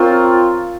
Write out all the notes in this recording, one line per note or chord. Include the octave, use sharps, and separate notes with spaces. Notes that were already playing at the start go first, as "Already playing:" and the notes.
Already playing: C4 F4 A#4 C#5